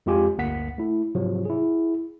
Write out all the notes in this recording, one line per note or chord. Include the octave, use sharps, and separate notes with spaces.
F2 G#3 F4 G4 G#5
G1 D2 A#3 F#5 B6
A3 E4
G#2 C3 F3 F#3
E4 G#4